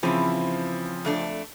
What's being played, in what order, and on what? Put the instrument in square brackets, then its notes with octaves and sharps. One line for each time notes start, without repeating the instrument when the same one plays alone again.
[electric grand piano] C#3 F3 C4 [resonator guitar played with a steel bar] E3 E4
[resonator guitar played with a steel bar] F2 A3 D4